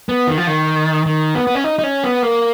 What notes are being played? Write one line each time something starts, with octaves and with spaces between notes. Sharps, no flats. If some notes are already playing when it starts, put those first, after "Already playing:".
B3
D#3
F3
D#3
D#3
B3
B3
C#4
D#4
D#4
C#4
B3
A#3